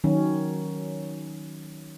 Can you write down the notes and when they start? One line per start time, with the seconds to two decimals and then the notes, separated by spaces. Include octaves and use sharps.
0.04 D#3 F#3 C#4